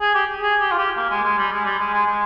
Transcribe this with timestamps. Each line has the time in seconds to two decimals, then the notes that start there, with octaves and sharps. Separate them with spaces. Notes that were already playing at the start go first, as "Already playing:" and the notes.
0.01 G#4
0.15 G4
0.42 G#4
0.60 G4
0.72 F4
0.78 G4
0.97 A#3
1.10 G#3
1.24 G#3
1.38 G3
1.52 G#3
1.65 G3
1.79 G#3
1.93 G#3
2.06 G#3